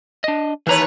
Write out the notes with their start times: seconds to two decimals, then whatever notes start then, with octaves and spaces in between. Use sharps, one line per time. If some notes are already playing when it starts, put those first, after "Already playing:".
0.24 D4 D#5
0.67 D#2 E3 B4 C#5 A#5